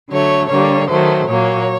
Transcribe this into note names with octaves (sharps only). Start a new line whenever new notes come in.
D3 F#3 A3 C#5
D3 G3 A#3 C#5
D#3 F#3 A3 C5
A#2 F#3 A#3 C#5